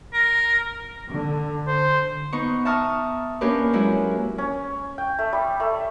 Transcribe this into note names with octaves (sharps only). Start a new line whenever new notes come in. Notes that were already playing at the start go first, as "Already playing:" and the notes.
A#4
D3
C5
B3 D#4 C#6
E5 A5 A#5 C#6 D#6 F6
A#3 C#4 D4 G4 A#4 B4
F#3 G#3 E4 F#4
C#4
G5
A3
G3
A3